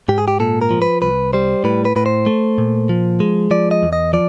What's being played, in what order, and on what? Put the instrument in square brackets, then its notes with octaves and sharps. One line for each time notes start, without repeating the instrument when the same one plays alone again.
[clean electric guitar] G#2 G4
G#4
G4
A#2 A4
A#4
F3
B4
C2 B4
G3 C5
A2 B4
B4
A2 B4
C5
A3
A#2
F3
G#3
F3 D5
D#5
E2
D#5
F3 D5